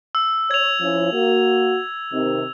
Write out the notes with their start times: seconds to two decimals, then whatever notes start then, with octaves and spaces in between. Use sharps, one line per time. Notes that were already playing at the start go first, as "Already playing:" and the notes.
0.15 E6
0.51 C#5 G#6 F7
0.80 F3 C#4 E4
1.13 A#3 F#4
2.12 C3 D#3 C4